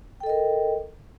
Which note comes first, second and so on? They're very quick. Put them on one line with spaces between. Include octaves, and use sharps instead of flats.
G5 A4 D#5 A#4